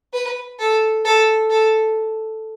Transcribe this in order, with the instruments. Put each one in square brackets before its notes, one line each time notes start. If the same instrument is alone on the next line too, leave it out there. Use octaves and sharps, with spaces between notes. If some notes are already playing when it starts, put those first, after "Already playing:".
[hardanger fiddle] B4
A4
A4
A4